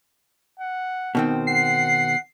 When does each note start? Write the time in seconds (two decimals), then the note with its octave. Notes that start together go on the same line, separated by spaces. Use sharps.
0.59 F#5
1.15 B2 D#3 C4
1.47 F#5 C7